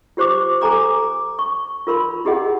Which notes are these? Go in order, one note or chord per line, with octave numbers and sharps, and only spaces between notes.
F4 G4 C5 C#6 D6
A4 G#5 A#5 D6
C#6
F4 A#4 B5 C6
E4 G4 G#4 D#5 F#5